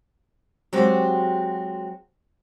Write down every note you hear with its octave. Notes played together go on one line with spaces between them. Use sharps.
F#3 G#3 C4 F#4 G4